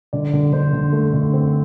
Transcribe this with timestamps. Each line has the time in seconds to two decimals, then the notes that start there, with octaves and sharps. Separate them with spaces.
0.13 D3 D5
0.33 D3
0.52 D3 C5
0.73 D3
0.92 A3
1.13 D3
1.33 C4